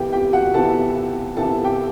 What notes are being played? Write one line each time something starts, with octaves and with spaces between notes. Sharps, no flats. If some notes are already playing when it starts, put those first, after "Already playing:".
Already playing: C3 E3 B3 G4 A4 G5
G4 G5
F#4 F#5
C3 E3 B3 A4 A5
C3 E3 B3 A4 A5
G4 G5